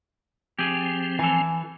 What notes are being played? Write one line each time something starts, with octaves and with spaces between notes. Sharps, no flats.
F3 C4 G4 G#4
E3 A4 G#5